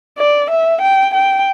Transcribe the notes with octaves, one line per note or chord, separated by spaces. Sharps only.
D5
E5
G5
G5